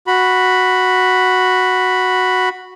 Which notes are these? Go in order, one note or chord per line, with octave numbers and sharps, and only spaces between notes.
F#4 B5